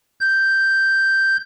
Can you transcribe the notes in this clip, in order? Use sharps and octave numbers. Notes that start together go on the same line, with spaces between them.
G6